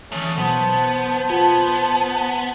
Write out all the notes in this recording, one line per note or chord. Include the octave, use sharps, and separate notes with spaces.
E3 F#3 A3 C#4 D#6
B2 F#3 B3 C5 A5
B3 F4 A5 G#6